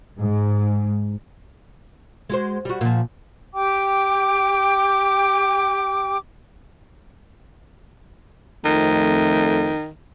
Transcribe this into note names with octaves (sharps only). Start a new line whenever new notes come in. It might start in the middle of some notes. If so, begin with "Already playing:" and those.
G#2
G#3 F#4 C5
G3 F#4
A#2 F3
G4 G5 D6
F2 D#3 A3